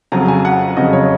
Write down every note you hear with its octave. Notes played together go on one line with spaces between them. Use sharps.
F2 C#3 F#3 A#5
G#5
F#5
F2 C#3 F#3 D#5
C#5